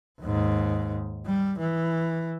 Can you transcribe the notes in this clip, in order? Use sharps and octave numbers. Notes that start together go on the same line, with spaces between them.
D#2 G#2
G3
E3